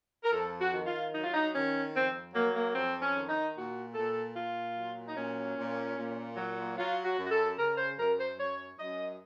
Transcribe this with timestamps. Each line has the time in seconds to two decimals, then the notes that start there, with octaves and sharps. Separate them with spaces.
0.24 A#4
0.32 F2 A4
0.59 F#4
0.73 D#3
0.86 F4
1.12 F#3 D#4
1.24 F4
1.33 D#4
1.53 D#3 C#4
1.93 F2 C4
2.33 F#3 A#3
2.54 A#3
2.74 F2 C4
3.01 C#4
3.15 D#3
3.28 D#4
3.55 A#2 F#4
3.94 A#2 A4
4.35 A#2 F4
4.76 F#3
5.07 D#4
5.15 A#2 C#4
5.57 A#2
5.96 A#2
6.37 F#3
6.77 F#3 F4
7.04 F#4
7.18 F#2
7.25 F#4
7.30 A4
7.57 C#3 A#4
7.77 C5
7.98 F#2 A#4
8.18 C5
8.39 F#2 C#5
8.79 F#2 D#5